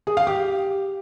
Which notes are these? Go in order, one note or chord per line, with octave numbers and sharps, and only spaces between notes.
G#4
F5
G4